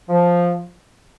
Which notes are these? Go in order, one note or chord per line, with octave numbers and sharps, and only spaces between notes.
F3